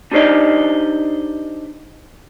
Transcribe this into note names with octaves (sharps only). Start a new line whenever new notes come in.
D4 D#4 G4 C5 D5 D#5